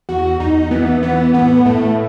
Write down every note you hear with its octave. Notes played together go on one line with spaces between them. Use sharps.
E2 F#4
E2 D#4
E3 B3
E3 B3
A2 B3
A2 A3